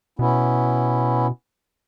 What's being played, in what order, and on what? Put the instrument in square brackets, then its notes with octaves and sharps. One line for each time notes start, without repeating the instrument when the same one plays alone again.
[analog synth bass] B2 [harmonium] B3 C#4 E4